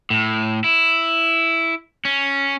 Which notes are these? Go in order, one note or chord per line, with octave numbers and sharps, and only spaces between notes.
A2
E4
C#4